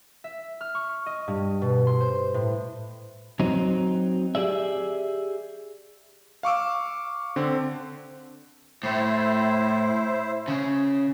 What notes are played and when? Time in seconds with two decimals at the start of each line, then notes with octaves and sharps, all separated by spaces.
0.24 E5
0.61 F6
0.75 C#6
1.06 D#5
1.28 G2
1.62 B2
1.87 C6
2.01 C5
2.34 A2
3.39 F#3 C4 D#4
4.35 G4 G#4 D5 E5
6.43 F5 C#6 D6 E6
7.36 D3 C4
8.83 A2 E4 C5
10.48 C#3